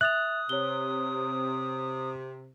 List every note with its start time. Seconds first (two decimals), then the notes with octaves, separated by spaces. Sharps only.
0.01 E5 D#6 F#6 A6 F7
0.49 C3 C#5 G7